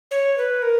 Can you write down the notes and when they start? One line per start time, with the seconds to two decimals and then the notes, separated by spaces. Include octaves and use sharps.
0.11 C#5
0.38 B4
0.62 A#4